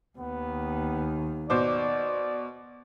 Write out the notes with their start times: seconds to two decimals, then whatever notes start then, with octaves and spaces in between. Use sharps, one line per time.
0.18 D#2 D#3 B3
1.50 B2 C5 D5 D6